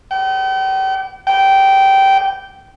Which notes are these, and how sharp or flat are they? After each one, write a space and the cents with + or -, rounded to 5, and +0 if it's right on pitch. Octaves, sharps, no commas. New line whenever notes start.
G5 -40
G5 -15